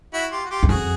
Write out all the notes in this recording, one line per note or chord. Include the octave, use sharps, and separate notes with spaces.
E4 F#4
F4 G4
F#4
F4 G4
E2
F2 F#4 G#4